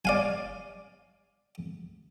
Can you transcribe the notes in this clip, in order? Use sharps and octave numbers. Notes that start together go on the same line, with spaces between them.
D5 F5 G#5